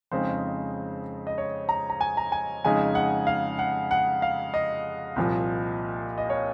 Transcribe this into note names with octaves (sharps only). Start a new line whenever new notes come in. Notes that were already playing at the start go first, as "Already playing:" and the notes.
F2 C#3 G#3 C4 D#4 C5
D#5
C#5
A#5
A#5
G#5
A#5
G#5
F2 C#3 G#3 D#4 G#5
F#5
F5
F#5
F#5
F5
D#5
C2 A#2 F3
D#5
C#5